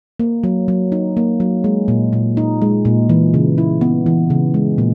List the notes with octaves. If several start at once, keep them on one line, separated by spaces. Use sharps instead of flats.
A#3
F#3
F#3
D#4
A#3
F#3
G#3
A#2
A#2
D#4
G#3
A#2
E3
C#3
E4
B3
E3
C#3
G#3
A#2